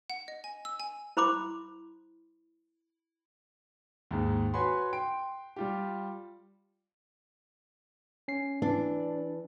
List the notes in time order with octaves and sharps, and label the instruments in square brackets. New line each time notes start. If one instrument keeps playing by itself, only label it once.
[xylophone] F#5
D#5
G#5
E6
G#5
[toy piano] E4 C5 B5 C6 D6
[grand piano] D#2 G#2
F#4 B4 C#5 G#5 B5 C6
G5 C6 D7
G3 F4 G4
[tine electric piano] C#4 C7
[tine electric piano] E3 [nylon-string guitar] D4